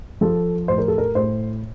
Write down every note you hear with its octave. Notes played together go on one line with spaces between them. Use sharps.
F3 A4
A2 C5
A#4
A4
A#4
A2 C5